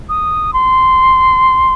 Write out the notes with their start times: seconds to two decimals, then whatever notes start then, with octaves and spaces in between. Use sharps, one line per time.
0.09 D#6
0.53 C6